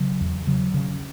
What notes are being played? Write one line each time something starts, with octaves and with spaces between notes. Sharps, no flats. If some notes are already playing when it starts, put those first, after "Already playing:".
Already playing: C#3 F#3
E2
C#3 F#3
C#3